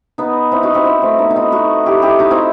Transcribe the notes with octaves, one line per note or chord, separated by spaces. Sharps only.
B3 D#4
C4 E4
D#4 F#4
C4 E4
C4 E4
A3 C4
B3 D#4
D#4
C4 E4
D#4 F#4
E4 G4
E4 G4
D#4 F#4
C4 E4